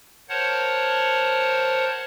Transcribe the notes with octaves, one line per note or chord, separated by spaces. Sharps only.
A#4 C5 C#5 F#5 A5